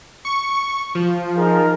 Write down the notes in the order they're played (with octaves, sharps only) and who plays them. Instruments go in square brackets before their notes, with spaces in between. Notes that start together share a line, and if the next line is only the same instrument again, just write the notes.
[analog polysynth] C#6
F3
[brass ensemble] D#4 G#4 A#4